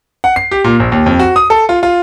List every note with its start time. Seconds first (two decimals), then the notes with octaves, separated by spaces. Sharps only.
0.24 F#5
0.36 C7
0.51 G4
0.64 A#2
0.80 A#1
0.92 D#2
1.06 F2
1.19 F#4
1.36 D#6
1.50 A4
1.69 F4
1.83 F4